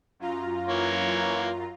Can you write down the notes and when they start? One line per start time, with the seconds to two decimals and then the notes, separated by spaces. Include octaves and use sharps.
0.19 F#2 F4 A#5
0.69 E3 A#3 C#5